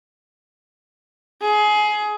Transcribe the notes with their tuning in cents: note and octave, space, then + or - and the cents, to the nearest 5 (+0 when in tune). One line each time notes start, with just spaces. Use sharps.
G#4 +25